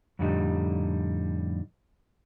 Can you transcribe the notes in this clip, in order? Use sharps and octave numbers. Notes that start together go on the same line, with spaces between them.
F2 A2 D3 G3 D#4